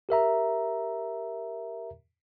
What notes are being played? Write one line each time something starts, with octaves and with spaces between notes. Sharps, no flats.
G4 A#4 E5 A#5